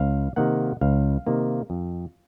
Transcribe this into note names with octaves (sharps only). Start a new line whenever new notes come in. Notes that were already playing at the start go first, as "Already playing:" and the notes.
Already playing: C#2 F5
C3 D#3 A#3 F#5
C#2 F5
C3 D#3 A#3
F2